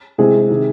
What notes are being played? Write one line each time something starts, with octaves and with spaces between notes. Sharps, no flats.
C3 E3 G#3 C4 G#4
C3 D#3